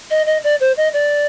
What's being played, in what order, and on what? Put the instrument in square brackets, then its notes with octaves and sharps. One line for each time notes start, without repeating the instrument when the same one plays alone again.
[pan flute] D#5
D#5
D5
C5
D#5
D5